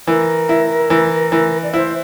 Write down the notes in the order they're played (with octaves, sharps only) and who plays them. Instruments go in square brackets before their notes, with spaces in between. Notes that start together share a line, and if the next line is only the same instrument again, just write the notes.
[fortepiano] E3 [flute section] A#4
[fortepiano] E4
E3
E3
[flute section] D5
[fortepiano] E4 [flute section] C5 E5